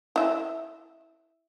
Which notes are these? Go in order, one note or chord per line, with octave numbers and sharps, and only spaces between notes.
E4 E5